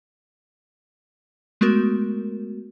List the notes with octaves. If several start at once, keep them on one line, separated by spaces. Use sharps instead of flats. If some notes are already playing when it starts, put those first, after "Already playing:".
G#3 A3 B3 F#4 A#4